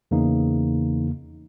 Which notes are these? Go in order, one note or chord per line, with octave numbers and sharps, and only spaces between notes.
E2 C#3 E3 A#3 D#4